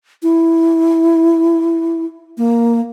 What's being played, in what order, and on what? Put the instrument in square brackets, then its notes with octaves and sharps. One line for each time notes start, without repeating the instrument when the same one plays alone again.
[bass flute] E4
A#3